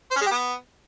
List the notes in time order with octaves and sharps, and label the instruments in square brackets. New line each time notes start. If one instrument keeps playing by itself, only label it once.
[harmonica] C5
C#4
G#3
G4
B3